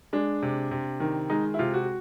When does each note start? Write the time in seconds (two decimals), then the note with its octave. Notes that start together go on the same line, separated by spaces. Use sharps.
0.13 G#3 D4
0.42 C3
0.71 C3
1.00 D#3
1.30 G#3 D#4
1.54 E4
1.59 C3 F4
1.74 F#4